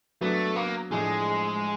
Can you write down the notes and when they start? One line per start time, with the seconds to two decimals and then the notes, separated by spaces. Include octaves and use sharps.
0.21 F#3 A3 B3 D4
0.56 A#3
0.91 A2 F3 G#3 A3 D4